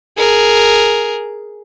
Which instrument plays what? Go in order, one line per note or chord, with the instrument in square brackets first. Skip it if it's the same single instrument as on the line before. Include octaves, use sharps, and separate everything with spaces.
[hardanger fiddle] G#4 A#4